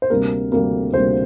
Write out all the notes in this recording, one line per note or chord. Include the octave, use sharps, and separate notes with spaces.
C5
D2 C3 G3 A#3 A#4
D2 C3 G3 A#3
D2 C3 G3 A#3 C5